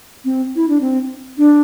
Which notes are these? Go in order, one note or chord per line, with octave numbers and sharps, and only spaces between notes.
C4
E4
D4
C4
D4